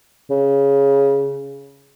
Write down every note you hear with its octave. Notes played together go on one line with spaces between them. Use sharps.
C#3